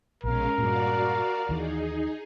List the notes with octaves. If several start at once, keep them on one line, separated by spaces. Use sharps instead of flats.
A#1 B2 G#3 C#4 A#4 F5
G2 A#2 F#4 D5 F5
D#2 E3 D#4 G#4